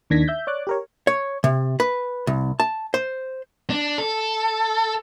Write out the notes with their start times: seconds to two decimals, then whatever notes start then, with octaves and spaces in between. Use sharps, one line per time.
0.10 D#2 D#3 D4 G#6 A#6 B6
0.28 E5 G6
0.47 C#5 D5 D6 F#6
0.67 G4 A#4 C#5
1.07 C#5
1.44 C3
1.80 B4
2.27 C2
2.60 A5
2.94 C5
3.70 D4
3.98 A4